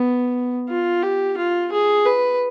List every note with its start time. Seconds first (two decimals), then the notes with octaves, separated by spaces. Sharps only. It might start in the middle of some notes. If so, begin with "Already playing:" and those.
Already playing: B3
0.69 F4
1.03 G4
1.37 F4
1.72 G#4
2.06 B4